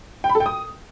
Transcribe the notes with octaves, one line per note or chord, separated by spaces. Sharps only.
G5
B5
A4
G5
D#6